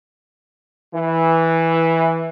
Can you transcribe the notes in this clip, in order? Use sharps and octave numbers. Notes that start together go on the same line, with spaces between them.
E3